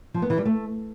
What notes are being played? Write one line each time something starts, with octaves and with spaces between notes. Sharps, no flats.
F3
B3
E3
G3
A3